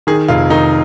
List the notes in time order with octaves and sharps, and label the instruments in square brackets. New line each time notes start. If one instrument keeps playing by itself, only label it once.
[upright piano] D#3 [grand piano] G#4
[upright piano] F1 [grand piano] F4
[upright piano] D#3 [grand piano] D#4